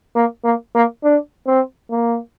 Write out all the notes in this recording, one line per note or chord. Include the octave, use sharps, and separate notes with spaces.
A#3
A#3
A#3
D4
C4
A#3